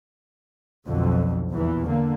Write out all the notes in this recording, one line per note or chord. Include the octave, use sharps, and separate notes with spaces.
B1 F2 B2 D3
E2 A#2 E3
D3 A#3